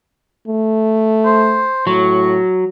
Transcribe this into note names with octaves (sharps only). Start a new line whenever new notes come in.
A3
C5
A2 F#3 C#6